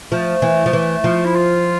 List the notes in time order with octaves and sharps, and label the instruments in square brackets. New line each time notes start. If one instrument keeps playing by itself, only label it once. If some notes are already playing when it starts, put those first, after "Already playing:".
[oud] F3 [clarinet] A3
[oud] E3
F3
E3
F3
[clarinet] E4
F4